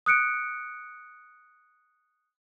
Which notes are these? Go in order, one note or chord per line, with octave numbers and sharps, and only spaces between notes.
D#6 F#6 C#7 D7